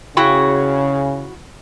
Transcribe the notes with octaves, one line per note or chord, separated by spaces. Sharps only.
C#3 E4 F#4 G5